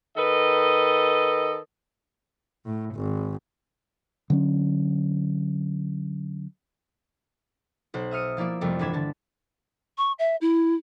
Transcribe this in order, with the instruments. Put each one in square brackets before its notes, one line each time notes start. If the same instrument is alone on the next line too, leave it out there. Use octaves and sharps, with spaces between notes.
[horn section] D#3 A4 B4 D#5
[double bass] A2
G#1
[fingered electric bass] D3 F#3 C#4
[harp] B1 C5 F#6
E5 D#6 F6 C#7 D#7
F3 A#3 E4 D5 E5
C2 F2 G3 A3 C4
G1 E3 D4 B5 G#6 E7
D3 A5
[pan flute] C#6
E5
E4